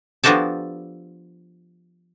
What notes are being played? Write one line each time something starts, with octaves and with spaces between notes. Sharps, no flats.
F3 B3 D4 F#4 G4 A4